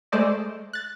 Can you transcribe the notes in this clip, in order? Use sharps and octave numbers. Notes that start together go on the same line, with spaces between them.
G#3 A3 A4 C5 D5 D#5
F#6 A6